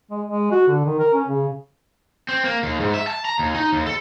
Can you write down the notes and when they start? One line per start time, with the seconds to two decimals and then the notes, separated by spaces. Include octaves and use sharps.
0.11 G#3
0.27 G#3
0.52 F#4
0.68 D3
0.86 D#3
0.99 A#4
1.14 C#4
1.28 C#3
2.29 C4
2.45 A#3
2.63 D#2
2.80 G#2
2.94 E5
3.07 A5
3.25 A#5
3.39 D#2
3.55 D#4
3.72 D#2
3.86 A4